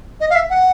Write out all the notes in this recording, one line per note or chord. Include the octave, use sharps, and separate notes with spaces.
D#5
F5
E5
F#5